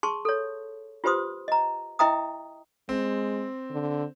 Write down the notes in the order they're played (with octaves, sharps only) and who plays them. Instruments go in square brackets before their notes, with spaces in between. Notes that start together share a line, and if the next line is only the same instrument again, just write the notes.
[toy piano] G#4 A5 C6 C#6
A4 C#5
F4 G4 B4 C5 C6 D#6
D#5 A#5
E4 D#5 E5 G5 A#5 D#6
[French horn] G#3 [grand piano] C4
[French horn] D3